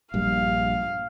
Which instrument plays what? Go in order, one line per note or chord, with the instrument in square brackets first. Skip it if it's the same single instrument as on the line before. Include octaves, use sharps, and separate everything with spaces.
[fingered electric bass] A#1 G2 G3 [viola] F5